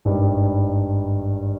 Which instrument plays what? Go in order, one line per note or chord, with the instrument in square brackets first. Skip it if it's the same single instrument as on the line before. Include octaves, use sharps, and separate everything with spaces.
[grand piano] G#1 G2 D#3 G3